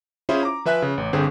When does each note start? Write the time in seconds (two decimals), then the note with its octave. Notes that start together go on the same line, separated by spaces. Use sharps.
0.29 C#4 E4 F4 G#4 C5 E5
0.43 A#5 D6
0.65 F3 B4 E5 G#5 F#6 B6
0.82 C#3
0.98 A1
1.13 G1 D3 C4 G#4 C5